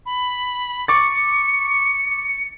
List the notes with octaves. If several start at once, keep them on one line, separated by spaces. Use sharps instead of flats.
B5
C#6 D6 A6 C#7